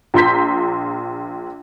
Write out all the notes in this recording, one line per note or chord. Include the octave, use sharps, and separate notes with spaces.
A#1 F4 A#5 C6 G6 B6